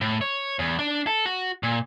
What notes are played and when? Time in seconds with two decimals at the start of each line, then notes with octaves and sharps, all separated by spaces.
0.01 A2
0.21 C#5
0.59 E2
0.79 D4
1.07 A4
1.26 F#4
1.63 A#2